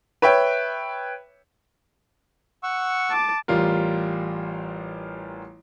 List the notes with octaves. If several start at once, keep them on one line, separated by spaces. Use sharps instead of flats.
B4 C#5 E5 G5
F#5 C#6 E6
A5 D6
A1 G3 F4 A#4